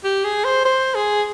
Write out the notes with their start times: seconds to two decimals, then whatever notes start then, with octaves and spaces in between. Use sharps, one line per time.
0.04 G4
0.24 G#4
0.44 C5
0.65 C5
0.95 G#4